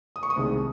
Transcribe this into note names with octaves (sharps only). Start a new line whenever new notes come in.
D#6
C#6
D#6
C2 C3 D#3 G#3